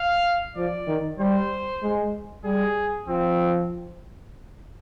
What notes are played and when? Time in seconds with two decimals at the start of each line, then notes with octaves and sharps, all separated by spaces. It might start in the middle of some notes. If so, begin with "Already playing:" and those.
Already playing: F5
0.56 F3 D5
0.87 D#3
1.19 G3 C5
1.83 G#3
2.44 G3 G#4
3.08 F3 C4